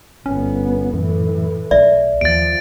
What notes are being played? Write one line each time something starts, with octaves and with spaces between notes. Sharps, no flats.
G1 B3 C#4
F#2 A2 E3
B1 D5 E5
D#2 F3 A6 D7